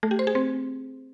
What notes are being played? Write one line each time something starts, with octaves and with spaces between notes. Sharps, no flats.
A3
G4
C5
G#4
C4